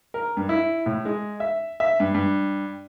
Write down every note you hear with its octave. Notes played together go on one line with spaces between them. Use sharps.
A#4
G2
E4
A2
G#3
E5
E5
G2
G2